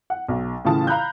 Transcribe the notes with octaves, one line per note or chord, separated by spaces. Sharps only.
F#5
B1
A2 C#3 E3 F4 A5 D#6
F5 A#5 B5 F#6 G6